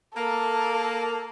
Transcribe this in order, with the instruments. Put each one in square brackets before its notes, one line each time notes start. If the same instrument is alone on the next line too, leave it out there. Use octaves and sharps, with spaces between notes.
[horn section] A#3 [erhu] A4